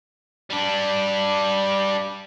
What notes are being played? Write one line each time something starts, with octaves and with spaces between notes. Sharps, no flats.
G3 D4